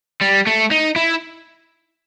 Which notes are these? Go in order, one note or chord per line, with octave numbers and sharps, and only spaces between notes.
G3
A3
D#4
E4